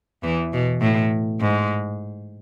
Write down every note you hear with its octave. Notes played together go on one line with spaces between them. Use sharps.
E2 E3
B2
A2
G#2